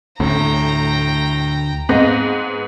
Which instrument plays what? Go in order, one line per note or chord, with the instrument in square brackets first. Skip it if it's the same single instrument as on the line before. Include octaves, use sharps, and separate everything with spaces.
[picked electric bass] D2 [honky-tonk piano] A2 [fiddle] G5 A#5
[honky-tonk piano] G#2 B3 A#6 [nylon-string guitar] C4 D#5 F5